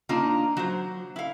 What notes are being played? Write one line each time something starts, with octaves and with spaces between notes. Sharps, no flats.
A#3 D4 D#4 F4 A#5
F#3 C5
E4 F5